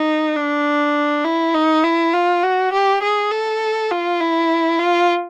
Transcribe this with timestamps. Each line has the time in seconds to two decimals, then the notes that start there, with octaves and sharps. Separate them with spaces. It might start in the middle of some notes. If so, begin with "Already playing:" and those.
Already playing: D#4
0.36 D4
1.25 E4
1.54 D#4
1.84 E4
2.13 F4
2.43 F#4
2.73 G4
3.02 G#4
3.32 A4
3.91 F4
4.20 E4
4.79 F4